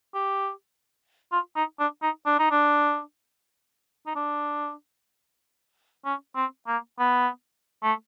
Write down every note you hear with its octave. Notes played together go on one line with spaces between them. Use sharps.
G4
F4
D#4
D4
D#4
D4
D#4
D4
D#4
D4
C#4
C4
A#3
B3
A3